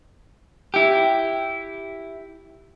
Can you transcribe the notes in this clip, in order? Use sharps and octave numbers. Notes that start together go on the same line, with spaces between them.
E4 G4